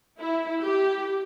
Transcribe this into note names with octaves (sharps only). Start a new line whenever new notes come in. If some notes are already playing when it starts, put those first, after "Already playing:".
E4
G4